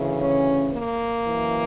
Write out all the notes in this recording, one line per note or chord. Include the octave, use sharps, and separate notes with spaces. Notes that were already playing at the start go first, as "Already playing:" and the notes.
Already playing: D2 C#3 E3
C#4
A#3
F#2 E3